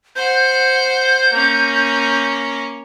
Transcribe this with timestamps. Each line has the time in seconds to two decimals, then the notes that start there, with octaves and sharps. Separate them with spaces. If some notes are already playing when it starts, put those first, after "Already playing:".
0.16 C5 F#5 G6
1.32 A#3 C#4